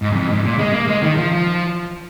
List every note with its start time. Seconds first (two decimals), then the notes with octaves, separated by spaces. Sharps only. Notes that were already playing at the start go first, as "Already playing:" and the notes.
0.02 G#2
0.12 G#2
0.16 F2
0.30 G#2
0.44 A#2
0.59 G#3
0.73 A#3
0.88 G#3
1.02 D#3
1.17 F3
1.32 F3